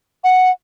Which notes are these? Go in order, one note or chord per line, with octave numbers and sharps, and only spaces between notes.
F#5